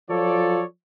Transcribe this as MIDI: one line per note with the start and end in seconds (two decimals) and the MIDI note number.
0.10 0.64 53
0.10 0.64 54
0.10 0.64 65
0.10 0.64 69
0.10 0.64 73
0.10 0.64 74